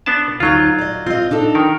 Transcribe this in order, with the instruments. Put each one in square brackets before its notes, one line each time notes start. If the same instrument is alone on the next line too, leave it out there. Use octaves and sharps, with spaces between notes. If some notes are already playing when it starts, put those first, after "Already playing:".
[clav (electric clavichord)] B3 D4 A5
[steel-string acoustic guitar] D2 D#4 F5 [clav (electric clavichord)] F#3 F4
[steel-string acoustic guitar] D5 D#5
[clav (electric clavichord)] C4 [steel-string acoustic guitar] F4 D#5
[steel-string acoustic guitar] D4 D#4 A4
[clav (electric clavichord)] D#3 A#4